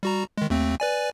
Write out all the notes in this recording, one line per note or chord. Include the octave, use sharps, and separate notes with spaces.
G3 F#4 A#5
D#3 G#3
D#2 A3 C4
B4 D5 G#5